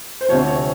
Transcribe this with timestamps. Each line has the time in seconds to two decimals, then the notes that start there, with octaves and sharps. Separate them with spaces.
0.21 C5
0.29 D2 C3 F3 C#5
0.47 C#5